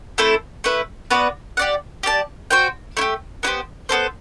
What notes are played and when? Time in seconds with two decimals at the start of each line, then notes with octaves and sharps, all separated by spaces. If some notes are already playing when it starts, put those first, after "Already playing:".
0.18 A3 C4 E4 A4
0.64 A3 E4 B4
1.11 B3 F#4 B4 D5
1.57 G4 D5 F#5
2.03 G4 D5 A5
2.51 F#4 C5 G5
2.97 A3 E4
3.01 G4
3.43 B3 E4 G4 C5
3.89 B3 D4 A4 C5